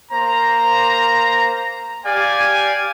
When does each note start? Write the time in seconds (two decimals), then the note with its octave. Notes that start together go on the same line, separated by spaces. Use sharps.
0.11 A#3 C5 A#5
2.05 G4 D5 F5 G#5